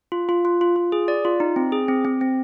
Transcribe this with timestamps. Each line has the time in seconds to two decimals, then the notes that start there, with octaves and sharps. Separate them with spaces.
0.12 F4
0.29 F4
0.45 F4
0.61 F4
0.76 F4
0.92 G#4
1.08 D5
1.25 F4
1.40 D#4
1.56 C4
1.72 G#4
1.88 C4
2.05 C4
2.21 C4